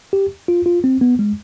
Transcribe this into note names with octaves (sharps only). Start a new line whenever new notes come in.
G4
F4
F4
C4
B3
G#3